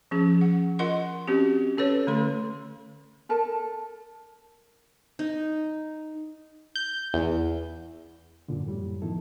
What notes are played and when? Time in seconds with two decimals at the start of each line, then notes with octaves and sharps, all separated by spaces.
0.11 F3 C#4 G#4
0.41 F#5
0.79 F4 A#4 D#5 F#5 C6
1.28 C4 C#4 F#4 G4
1.78 C#4 A4 B4 C#5
2.07 D3 A3 C6
3.29 A4 A#4 A5
5.19 D#4
6.76 G6
7.14 E2
8.48 F#2 A#2 D3
8.67 F#2 A2 G3
9.02 D#3 F3 B3 E4 A4